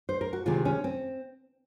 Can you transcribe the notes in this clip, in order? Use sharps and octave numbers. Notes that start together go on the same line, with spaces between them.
C5
A#4
F#4
C3 D#3 G#3 C4 F4
C#4
C4